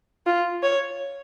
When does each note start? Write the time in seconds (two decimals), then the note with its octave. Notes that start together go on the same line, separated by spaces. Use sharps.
0.27 F4
0.63 C#5